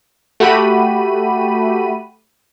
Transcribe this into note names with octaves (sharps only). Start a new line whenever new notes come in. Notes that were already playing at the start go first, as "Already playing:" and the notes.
A3 F#4 G4 B5 D#7